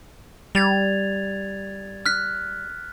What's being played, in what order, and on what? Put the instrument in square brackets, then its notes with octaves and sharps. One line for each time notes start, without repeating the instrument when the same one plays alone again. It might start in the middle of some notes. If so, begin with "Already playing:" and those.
[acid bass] G3 [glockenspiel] G#6 A6 F7
[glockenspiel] F6 F#6 B6